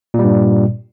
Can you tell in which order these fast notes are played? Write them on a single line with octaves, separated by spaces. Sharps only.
A#2 G3 G2